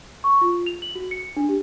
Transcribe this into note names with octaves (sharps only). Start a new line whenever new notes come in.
C#6
F4
F7
F#7
F#4
C#7
D4
G4